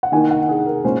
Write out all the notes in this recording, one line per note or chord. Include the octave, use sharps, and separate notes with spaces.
F#5
D#3 A#3 D#4 G#5
F#5
G#4
A#4
A#2 G#3 C#4 C5